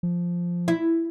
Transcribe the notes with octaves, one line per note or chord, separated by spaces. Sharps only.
F3
E4